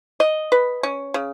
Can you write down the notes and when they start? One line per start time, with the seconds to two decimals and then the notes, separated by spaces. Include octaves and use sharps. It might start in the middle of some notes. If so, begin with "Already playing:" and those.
0.20 D#5
0.52 B4
0.83 C#4
1.14 C#3